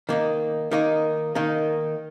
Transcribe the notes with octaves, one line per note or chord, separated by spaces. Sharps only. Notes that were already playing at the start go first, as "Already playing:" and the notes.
D#3 A#3 D#4
D#3 A#3 D#4
D#3 A#3 D#4